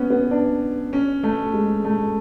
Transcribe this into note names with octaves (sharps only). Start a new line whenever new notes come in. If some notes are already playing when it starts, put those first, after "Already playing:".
Already playing: B3 C#4
B3
D4
C#4
A3
G#3
A3